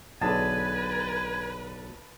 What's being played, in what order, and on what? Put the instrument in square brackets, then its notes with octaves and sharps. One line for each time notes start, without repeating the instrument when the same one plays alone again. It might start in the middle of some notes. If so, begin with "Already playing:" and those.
[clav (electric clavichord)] B1 D3 G#4 [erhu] B4 [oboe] G#5 [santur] A5